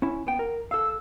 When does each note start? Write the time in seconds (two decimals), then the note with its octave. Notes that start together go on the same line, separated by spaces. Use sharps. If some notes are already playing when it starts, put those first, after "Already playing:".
0.02 C#4 E4
0.27 B3 G5
0.39 A#4
0.71 A4 F5 E6